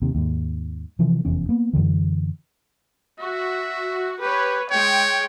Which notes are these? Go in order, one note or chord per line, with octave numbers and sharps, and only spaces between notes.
D#2 C3
D#2 G#2
C3 E3 F3
F1 E2 C#4
A#3 B3
F#2 A#2 D3 E3
F#4 E5
G4 B4 C#5
G#3 C#5 G5